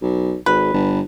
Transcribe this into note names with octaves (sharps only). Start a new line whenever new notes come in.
B1
G#1 B4
G1